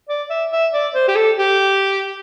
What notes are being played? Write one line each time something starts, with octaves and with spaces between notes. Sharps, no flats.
D5
E5
E5
D5
C5
G4
A4
G4